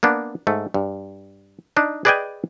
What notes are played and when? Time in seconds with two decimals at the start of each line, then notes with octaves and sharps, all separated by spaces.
0.03 A#3 B3 D4
0.47 G#2 A3
0.74 G2
1.77 D4 D#4
2.05 G#4 B4 D5 D#5 G5 G#5